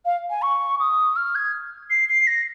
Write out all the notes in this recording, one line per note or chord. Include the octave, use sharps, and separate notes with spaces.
F5
G#5
C#6
D#6
F6
G#6
C7
C7
A#6